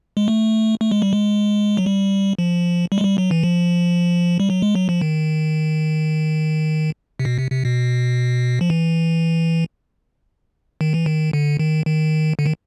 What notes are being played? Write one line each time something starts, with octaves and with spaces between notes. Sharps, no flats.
G#3
A3
A3
G#3
G3
G#3
F#3
G3
F3
G3
G#3
G3
F#3
E3
F3
G3
F#3
G#3
F#3
F3
D#3
C3
B2
C3
C3
B2
F3
E3
D#3
E3
D#3
D3
D#3
D#3
D3
D#3